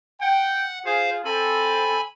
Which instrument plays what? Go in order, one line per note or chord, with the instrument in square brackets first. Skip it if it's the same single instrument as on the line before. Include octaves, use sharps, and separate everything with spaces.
[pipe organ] F#5 [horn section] G5
[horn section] F4 G#4 [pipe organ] C5 F5
[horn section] C4 A4 [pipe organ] G#5 B5